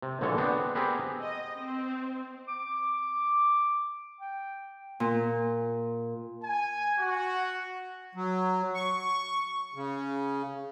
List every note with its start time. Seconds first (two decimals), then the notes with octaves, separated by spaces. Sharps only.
0.02 C3
0.21 A#1 D3 E3 G#3 A4 C#5
0.38 B3 C4 D4
0.75 B3 C4 G4 G#4 A#4 B4
1.21 D#5
1.56 C4
2.48 D6
4.21 G5
5.00 A#2
6.43 G#5
6.99 F#4
8.15 F#3
8.75 C#6
9.74 C#3